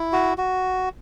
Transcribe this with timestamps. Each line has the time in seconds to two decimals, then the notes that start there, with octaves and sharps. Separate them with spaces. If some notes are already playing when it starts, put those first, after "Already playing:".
Already playing: E4
0.13 F#4
0.38 F#4